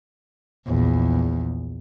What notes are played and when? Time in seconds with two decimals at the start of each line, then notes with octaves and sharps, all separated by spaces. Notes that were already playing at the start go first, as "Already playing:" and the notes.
0.66 A#1 E2